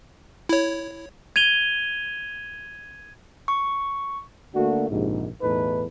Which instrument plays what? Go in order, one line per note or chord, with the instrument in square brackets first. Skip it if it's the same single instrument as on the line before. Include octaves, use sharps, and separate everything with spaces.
[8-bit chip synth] E4 C#5
[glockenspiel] G#6 D#7 F7 G7
[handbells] C#6
[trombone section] D3 A3 A#3 D4 F#4
A#1 G#2 C3
B1 E2 A2 D#4 A4 B4